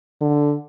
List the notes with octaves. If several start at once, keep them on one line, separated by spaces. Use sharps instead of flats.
D3